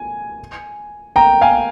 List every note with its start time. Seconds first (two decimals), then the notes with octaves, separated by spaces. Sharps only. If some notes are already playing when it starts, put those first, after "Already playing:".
Already playing: G#5
1.16 G5 A#5
1.41 F5 G#5